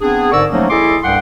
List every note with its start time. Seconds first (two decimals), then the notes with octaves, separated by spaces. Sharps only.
0.01 B3 C4 D4 G#4
0.32 G#2 D3 A#4 D5 C#6 E6
0.51 F3 F#3 A3 A#3 C#4 D#4
0.70 E4 G#4 A4 D#5 C6 D6
1.03 C2 G2 F#5 G5 C6